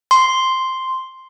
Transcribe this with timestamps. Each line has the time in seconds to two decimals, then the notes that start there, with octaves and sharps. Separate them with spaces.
0.11 C6